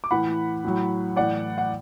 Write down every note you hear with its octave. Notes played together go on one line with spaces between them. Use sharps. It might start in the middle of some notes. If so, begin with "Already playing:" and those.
D6
A2 E3 F#5 B5
A2 F#3
A2 E3 D5 F#5
F#5